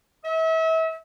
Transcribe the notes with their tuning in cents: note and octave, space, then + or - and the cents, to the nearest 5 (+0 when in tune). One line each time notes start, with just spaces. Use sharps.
E5 -35